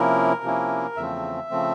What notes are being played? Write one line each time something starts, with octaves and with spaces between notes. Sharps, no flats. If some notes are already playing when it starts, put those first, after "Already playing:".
Already playing: C3 F3 A#3 C#4 E4 A#4
C3 F3 A#3 C#4 E4
E2 C#3 F3 A3 C4 E5
C#3 F3 A3 C4